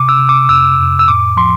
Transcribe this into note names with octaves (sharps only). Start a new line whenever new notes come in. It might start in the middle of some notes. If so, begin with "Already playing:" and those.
Already playing: C3 D6
E6
C3
D6
F2 E6
F2
E6
A2 D6
F3 C6